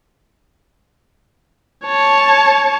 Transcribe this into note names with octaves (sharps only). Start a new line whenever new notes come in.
C#5 A5